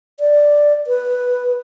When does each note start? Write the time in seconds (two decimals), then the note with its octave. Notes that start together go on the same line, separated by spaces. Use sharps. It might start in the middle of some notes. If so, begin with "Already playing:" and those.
0.20 D5
0.87 B4